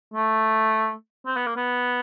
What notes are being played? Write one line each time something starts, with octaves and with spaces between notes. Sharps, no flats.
A3
C4
B3
A#3
B3